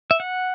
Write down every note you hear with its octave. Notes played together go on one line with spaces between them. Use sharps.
E5
F#5